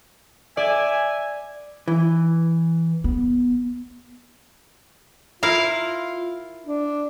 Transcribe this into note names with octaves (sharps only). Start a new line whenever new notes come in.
D5 E5 G#5
E3
B3
E4 F4 A#4 F5
D4